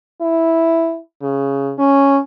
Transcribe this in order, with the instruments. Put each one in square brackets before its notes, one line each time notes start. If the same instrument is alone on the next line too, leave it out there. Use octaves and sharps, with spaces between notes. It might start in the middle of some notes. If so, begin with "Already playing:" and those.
[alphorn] E4
C#3
C#4